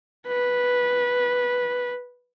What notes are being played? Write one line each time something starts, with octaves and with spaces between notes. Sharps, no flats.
B4